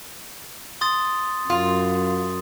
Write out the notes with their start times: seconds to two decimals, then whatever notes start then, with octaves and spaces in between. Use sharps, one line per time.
0.81 C6 D#6 A6
1.50 F#2 F4